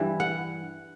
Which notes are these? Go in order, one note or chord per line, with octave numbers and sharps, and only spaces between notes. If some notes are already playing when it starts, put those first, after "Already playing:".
Already playing: G2 E3 G3
F#5